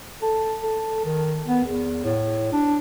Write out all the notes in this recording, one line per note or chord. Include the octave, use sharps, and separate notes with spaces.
A4
A4
D#3
B3
E2
A2
D4